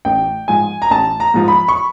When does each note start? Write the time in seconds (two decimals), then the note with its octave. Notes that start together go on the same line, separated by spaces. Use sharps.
0.05 A1 G5
0.48 G#2 F3 G#5
0.82 A#5
0.90 A1 A5
1.20 A#5
1.34 G#2 F3
1.48 B5
1.68 C#6